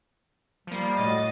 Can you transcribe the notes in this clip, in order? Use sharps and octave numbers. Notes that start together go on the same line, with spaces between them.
F3 G3 A#3
A2 F#4 D#5 A6